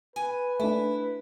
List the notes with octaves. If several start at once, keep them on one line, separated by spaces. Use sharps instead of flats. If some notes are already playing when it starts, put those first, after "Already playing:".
B4 G#5
A3 D4 E4